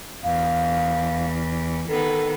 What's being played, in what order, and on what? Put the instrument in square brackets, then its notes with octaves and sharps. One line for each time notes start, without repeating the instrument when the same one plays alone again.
[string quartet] E2 [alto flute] F5
[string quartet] D#3 B3 [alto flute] A4